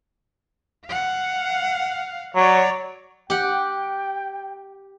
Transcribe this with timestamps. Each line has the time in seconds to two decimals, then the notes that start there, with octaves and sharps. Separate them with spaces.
0.86 F5 F#5
2.35 F#3 C#5 D5
3.30 G4 F#5 G5